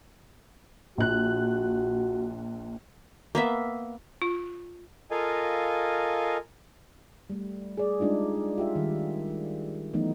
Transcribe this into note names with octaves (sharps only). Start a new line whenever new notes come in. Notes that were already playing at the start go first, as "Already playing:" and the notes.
A#1 F#4 F#6
A#3 B3 E5
F4
F4 A4 A#4 D#5 F5 G#5
G3 A3
G#4 D5
G3 G#3 D4 D#4 F4
F4 G4 E5
D#3 G3
E3 F#3 A3 B3 D#4